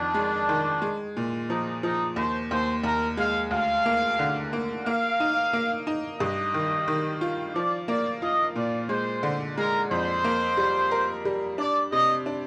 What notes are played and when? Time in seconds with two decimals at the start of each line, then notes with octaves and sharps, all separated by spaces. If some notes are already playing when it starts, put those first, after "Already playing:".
Already playing: F2 D#3 D4
0.14 G#3
0.49 D#3
0.82 G#3
1.17 A#2
1.50 F3 D#4
1.83 F3 D#4
2.16 D#2 C5
2.51 D#2 C5
2.84 D#2 A#4
3.17 G#3 F5
3.51 D2 F5
3.86 A#3
4.19 D3
4.53 A#3
4.86 A#3 F5
5.20 D#4
5.53 A#3
5.87 D#4
6.20 G2 D#5
6.54 D#3
6.88 D#3
7.21 F4
7.54 F3 D5
7.88 A#3 D5
8.22 F4 D#5
8.55 A#2 D5
8.89 G#3 C5
9.23 D3
9.57 G#3 A#4
9.91 F2 C5
10.24 A#3
10.57 G3
10.91 A#4
11.25 G3
11.58 D4 D5
11.92 C3 D#5
12.26 D4